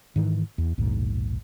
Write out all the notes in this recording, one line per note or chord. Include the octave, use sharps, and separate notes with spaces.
G#2 D#3 E3
E2
A#1 D#2 G#2 B2